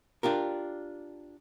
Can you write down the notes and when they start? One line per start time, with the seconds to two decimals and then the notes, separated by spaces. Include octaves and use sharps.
0.23 D4 F4 G4 A#4